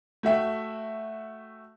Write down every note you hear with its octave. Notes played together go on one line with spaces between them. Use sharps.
A3 F#4 E5 G5